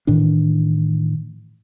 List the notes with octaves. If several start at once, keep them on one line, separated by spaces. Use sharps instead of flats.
A2 D#3 E3 D4